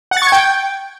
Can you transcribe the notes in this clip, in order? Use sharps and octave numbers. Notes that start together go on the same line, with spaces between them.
F#5
A6
C#6
G#6
G5